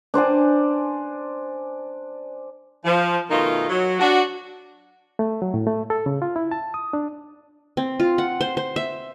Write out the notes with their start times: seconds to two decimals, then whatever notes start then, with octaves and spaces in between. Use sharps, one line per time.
0.14 D4 C5 D5 G#5
2.85 F3
3.30 B2 D#3 A3 D#4 F4 A#4
3.69 F#3
4.00 D4 F#4
5.19 A3
5.42 F#3
5.54 A2
5.67 A3
5.90 A4
6.06 C#3
6.22 F4
6.36 E4
6.51 A5
6.74 D#6
6.93 D4
7.77 C4
8.00 F4
8.18 F#5
8.41 C5
8.57 C5
8.76 E5